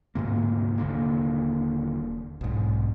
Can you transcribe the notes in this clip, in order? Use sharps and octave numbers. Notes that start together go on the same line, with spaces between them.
D2 G#2 C3 A#3
D#1 D3 A#3
B1 G#2